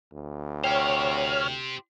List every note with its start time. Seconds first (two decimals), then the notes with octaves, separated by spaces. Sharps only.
0.12 D2
0.64 G4 C5 C#5 G5 F6